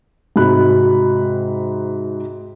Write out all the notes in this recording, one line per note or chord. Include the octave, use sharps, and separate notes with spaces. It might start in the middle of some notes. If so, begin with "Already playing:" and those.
G#2 C3 F#4 B5 F#6